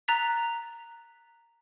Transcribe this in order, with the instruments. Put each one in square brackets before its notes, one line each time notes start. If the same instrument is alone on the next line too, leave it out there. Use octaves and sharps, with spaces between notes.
[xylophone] A#5 F#6 A6 B6